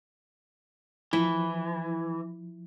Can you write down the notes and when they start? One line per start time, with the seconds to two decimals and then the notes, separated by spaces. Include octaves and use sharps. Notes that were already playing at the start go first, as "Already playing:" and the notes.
1.13 E3 F3 E4